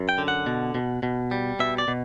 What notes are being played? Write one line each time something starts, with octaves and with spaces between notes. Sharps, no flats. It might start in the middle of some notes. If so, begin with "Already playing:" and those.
Already playing: F#2
G5
D3
F#5
B2
B2
B2
G3
B2 E5
D5
B2